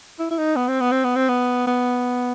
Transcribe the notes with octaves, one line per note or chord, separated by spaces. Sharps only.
E4
E4
D#4
B3
C4
B3
C4
B3
C4
B3
B3